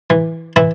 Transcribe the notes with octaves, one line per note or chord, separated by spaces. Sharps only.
E3
E3 E4